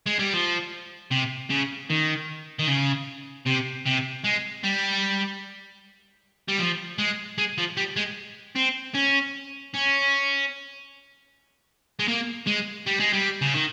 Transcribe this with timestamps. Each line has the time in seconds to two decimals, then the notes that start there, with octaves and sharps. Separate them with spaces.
0.06 G#3
0.19 G3
0.34 F3
1.11 C3
1.50 C#3
1.90 D#3
2.59 D#3
2.67 C#3
3.46 C3
3.86 C3
4.24 G#3
4.63 G3
6.48 G3
6.59 F3
6.98 G#3
7.38 G#3
7.58 F3
7.77 G3
7.96 G#3
8.56 C4
8.95 C#4
9.74 C#4
11.99 G#3
12.08 A#3
12.47 G#3
12.86 G3
13.00 G#3
13.13 G3
13.42 C#3
13.54 D#3